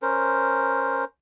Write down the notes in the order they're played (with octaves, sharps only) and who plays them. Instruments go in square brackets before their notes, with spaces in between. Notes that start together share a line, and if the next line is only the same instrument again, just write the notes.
[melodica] C#4 A#4 C5